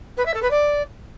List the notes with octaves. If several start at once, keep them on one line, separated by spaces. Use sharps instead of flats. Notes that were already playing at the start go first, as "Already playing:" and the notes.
B4
E5
A4
B4
D5